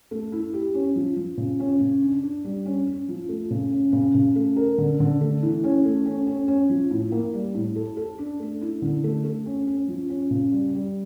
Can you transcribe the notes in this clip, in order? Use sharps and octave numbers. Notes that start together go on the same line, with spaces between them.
A3
E4
G4
C#4
F3
F3
C#3
C#4
C#3
D4
D4
G3
C#4
C#4
F3
A3
C#3
C#4
C#3
C#3
A3
A#4
D3
D3
A3
E3
C#4
A3
C#4
C#4
C#4
F3
A2
A#3
G3
A2
A4
A4
D4
A3
E4
D3
A3
A3
C#4
C#4
F3
C#4
C#3
G3
G3